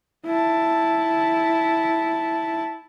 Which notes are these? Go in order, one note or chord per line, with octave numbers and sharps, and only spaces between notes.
E4 A5